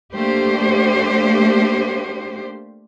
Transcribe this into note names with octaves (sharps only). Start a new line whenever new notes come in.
A3 A#3 D4 G4 C5